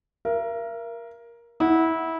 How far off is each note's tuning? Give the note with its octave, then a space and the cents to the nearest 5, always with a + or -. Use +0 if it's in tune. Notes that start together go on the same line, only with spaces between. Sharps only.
A#4 +15 E5 +45
E4 -20 F#5 -10